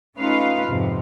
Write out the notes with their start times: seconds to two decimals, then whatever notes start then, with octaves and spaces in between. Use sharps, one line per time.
0.17 A3 C#4 D#4 F4 B4 F5
0.68 F2 G#2 C3